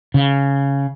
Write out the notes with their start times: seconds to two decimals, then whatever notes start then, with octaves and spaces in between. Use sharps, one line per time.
0.14 C#3